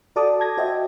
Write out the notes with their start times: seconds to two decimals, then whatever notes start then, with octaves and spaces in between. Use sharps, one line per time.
0.16 F#4 A4 D5 A5 D6 D#6
0.40 A5 G#6 A#6
0.57 F#4 C5 D#5 E5 G5